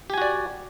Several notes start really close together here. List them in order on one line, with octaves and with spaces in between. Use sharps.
G4 G#5 F#4 D5